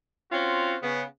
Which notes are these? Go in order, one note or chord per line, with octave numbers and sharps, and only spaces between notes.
C4 C#4 F4 F#4
C#3 B3